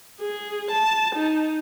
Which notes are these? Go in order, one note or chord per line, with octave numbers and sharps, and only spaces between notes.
G#4
A5
D#4